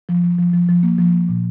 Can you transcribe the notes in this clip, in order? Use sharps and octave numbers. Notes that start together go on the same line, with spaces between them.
F3
F3
F3
F3
F3
A#3
F3
A#3
A#2